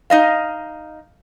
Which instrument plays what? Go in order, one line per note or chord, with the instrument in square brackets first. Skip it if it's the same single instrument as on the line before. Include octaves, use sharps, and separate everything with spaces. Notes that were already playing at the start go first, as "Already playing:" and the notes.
[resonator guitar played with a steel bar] D#4 D#5 F5